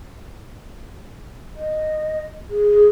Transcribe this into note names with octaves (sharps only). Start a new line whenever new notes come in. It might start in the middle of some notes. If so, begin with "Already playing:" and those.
D#5
G#4